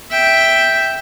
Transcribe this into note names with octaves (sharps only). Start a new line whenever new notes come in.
E5 G5